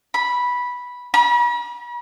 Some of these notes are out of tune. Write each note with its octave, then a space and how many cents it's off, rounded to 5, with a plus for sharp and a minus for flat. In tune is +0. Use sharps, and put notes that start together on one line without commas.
B5 -10
B5 -45